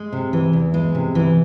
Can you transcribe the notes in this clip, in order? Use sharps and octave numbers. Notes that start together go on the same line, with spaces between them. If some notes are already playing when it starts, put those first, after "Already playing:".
Already playing: G#3
C3
E3
E2
G#3
C3
E3